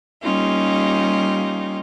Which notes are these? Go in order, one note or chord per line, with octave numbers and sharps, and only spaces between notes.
G3 A#3 C#4 D#4 F4 G4